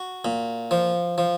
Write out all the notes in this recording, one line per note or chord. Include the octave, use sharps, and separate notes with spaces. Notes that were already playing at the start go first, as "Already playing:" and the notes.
Already playing: F#4
A#2
F3
F3